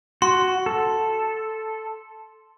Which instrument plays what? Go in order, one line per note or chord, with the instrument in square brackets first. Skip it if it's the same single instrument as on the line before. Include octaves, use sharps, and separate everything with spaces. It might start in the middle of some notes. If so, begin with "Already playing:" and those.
[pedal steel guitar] F#4 [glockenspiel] C6
[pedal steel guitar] A4